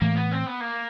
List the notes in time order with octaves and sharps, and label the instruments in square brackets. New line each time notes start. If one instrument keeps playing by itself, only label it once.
[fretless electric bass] A2 E3 A3 [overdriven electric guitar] A#3
[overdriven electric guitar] B3
C4
B3
A#3